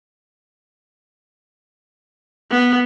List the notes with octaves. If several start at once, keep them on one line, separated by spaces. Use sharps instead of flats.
B3